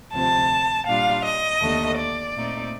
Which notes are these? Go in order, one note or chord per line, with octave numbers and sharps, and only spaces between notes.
D2 C3 F3 C4 A5
A#2 G3 D4 F4 F5
D#5
D#2 D3 A3
D5
A#2 A3 C4 D#4